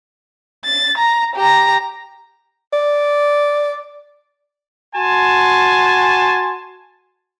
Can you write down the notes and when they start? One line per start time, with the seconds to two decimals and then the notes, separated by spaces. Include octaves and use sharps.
0.65 A6
0.98 A#5
1.36 G4 A#5
2.73 D5
4.95 F#4 G#5 A5 C6